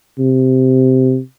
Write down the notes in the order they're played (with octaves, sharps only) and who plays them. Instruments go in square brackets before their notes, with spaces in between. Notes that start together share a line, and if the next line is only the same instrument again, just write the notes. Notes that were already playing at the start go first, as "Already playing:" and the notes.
[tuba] C3